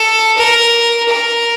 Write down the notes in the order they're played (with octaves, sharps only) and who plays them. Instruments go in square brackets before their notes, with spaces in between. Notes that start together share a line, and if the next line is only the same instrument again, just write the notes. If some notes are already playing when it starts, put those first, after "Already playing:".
Already playing: [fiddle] A4
A#4
A#4